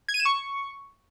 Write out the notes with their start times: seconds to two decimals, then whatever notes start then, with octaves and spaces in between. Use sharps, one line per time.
0.08 G#6
0.14 D#7
0.20 E7
0.25 C#6